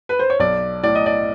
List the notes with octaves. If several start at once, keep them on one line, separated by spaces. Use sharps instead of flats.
B4
C5
C#5
B1 D5
A2 D5
D#5
D5